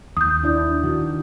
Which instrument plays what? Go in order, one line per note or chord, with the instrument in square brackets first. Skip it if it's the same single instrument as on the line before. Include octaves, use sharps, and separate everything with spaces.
[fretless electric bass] D#2 [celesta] D#6 G6
[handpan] D4 E4 D5
[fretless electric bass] D#3 [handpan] F#4